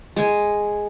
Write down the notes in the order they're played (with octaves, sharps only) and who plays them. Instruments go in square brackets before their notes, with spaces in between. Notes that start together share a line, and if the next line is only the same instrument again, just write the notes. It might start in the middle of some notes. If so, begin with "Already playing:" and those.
[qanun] G#3 G#5